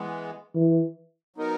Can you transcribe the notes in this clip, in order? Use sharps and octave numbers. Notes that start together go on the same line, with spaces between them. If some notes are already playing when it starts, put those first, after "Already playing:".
Already playing: E3 G#3 B3
E3
F#3 B3 D#4 A#4